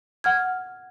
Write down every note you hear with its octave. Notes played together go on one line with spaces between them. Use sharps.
F#5 F6 G#6